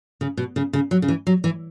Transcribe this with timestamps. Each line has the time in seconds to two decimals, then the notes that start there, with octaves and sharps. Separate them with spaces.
0.21 C#3
0.37 B2
0.56 C#3
0.73 C#3
0.91 F#3
1.02 C#3
1.08 E3
1.27 F#3
1.44 E3